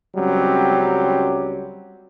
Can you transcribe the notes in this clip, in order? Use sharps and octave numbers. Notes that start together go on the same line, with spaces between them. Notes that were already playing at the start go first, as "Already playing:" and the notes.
C#2 F#3 G3 C4 C#4